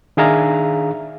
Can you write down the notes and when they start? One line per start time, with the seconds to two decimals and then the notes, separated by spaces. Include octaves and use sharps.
0.17 D#3 D4 G#4 E5 F5 A#5